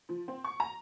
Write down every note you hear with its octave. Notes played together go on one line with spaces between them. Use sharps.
F3
C4
C#6
A#5